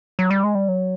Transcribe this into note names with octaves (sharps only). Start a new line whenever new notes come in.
F#3
G3
G#3
G3
F#3